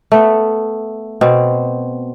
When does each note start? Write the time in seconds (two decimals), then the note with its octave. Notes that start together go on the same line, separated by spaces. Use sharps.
0.12 A3 B3
1.21 B2 C4